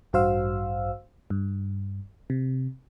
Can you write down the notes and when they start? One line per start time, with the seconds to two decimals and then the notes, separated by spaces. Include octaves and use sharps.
0.13 A1 G2 F#4 C5 F5 E6
1.30 G2
2.30 C3